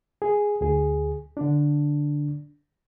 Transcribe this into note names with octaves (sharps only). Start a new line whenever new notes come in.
G#4
D2 G#4
D3 D4